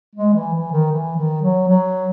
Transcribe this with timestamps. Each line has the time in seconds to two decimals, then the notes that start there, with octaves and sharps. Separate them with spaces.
0.15 G#3
0.34 E3
0.53 E3
0.72 D#3
0.92 E3
1.17 D#3
1.42 F#3
1.68 F#3